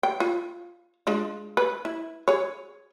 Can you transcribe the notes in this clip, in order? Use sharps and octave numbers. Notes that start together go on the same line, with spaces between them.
G5
F4
G#3 D4 F4
B4
E4
G#4 C#5